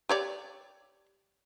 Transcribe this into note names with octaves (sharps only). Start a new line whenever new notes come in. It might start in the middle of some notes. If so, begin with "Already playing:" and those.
G4 C#5 D5